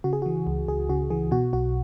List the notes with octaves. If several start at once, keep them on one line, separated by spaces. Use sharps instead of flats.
C#3 F#4
G#4
E3 F#4
C#2
C#2 G#4
C#3 F#4
E3 G#4
B2 F#4
B1 F#4